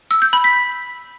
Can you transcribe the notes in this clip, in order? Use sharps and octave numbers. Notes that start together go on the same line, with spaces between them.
E6
G6
B5
B6